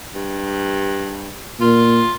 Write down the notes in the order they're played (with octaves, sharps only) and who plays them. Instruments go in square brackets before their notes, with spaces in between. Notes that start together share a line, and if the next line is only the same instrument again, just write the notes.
[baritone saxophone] G2
[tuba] A#2 [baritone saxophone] F4